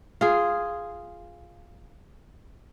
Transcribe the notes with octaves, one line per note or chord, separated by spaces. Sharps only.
F4 G#4